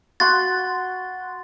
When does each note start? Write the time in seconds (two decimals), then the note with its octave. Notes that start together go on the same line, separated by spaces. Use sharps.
0.20 F#4 F#5 C6 A6